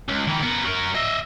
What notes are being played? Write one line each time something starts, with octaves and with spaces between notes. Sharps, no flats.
C#2
D#3 E3
B3 A#4
F#3 A#4
D#5 E5